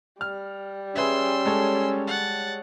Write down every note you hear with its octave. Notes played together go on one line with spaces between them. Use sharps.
G3 F6
C#4 G#4 B4 E5 C6 E6
G#3 A4 C#5
F#5 A6